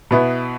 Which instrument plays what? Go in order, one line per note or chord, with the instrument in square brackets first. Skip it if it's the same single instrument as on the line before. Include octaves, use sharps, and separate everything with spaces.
[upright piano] B2 B3 E4